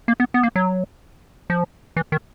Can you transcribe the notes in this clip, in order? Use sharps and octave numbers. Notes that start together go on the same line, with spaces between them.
A#3
B3
B3
A#3
F#3
F3
E3
D#3